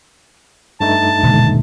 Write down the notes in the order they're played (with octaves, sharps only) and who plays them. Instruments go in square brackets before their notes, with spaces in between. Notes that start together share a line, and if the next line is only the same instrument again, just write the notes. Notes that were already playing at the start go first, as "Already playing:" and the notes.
[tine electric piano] G2 A3 D#4 [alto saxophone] A5
[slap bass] D#1 [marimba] B2 D3 G#3